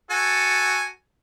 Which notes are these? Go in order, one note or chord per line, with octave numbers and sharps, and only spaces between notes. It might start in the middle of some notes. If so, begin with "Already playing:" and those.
F#4 A4 G#5